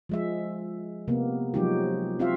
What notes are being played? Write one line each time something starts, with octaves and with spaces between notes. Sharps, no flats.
F3 G#3 E5
C3 A#3 B3
F3 F#3 G#3 D#4 F#4 G4
C4 F4 F#4 E5 F5